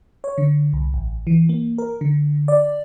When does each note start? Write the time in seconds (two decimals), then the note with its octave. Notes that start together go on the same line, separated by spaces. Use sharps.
0.24 C#5
0.38 D3
0.73 C2
0.94 A1
1.27 E3
1.49 A#3
1.78 A#4
2.01 D3
2.48 D5